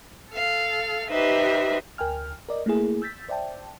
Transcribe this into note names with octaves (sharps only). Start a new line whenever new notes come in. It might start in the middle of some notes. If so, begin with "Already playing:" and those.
A4 F5
D#4 G4 B4 C5 E5
D2 A#4 G5 G#5 F6
A#4 D5 D#5
A3 A#3 E4 G#4
E6 G6 A6 B6
C5 D5 E5 G5 A5